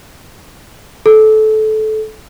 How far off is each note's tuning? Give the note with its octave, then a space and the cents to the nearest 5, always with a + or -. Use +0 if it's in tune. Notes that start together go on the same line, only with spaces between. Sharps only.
A4 -20